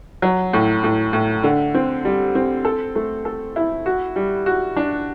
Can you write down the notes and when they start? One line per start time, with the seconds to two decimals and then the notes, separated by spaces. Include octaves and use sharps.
0.22 F#3
0.53 A2
0.84 A2
1.13 A2
1.44 D3
1.74 C4
2.05 G3
2.35 C4
2.65 A4
2.95 A3
3.25 A4
3.56 E4
3.86 F#4
4.16 G3
4.46 F#4
4.77 D4